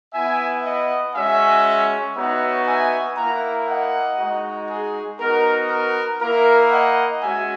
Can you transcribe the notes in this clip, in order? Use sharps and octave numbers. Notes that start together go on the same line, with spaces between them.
B3 E4 E5 G#5
D#5 F#5
G#3 C#4 F#4 E5 G#5
B3 D#4 F#4 C#5 E5
E5 G#5
A#3 E4 F#5 A#5
D#5 F#5
G#3 D#4 F#4
G#4
B3 D#4 F#4 A#4
A#4
A#3 E4 A#4
D#5 F#5
G#3 C#4 F#4 E5 G#5